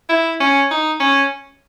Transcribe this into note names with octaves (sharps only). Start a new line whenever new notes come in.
E4
C#4
D#4
C#4